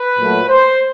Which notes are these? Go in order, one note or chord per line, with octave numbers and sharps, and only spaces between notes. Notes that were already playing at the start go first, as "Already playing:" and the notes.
Already playing: B4
A#2 F#3 A3
C5